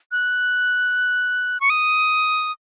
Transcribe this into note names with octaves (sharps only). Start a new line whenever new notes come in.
F#6
C#6
D#6